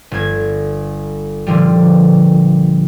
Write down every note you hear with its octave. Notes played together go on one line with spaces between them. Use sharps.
G1 G#6
A#2 D3 F3 G3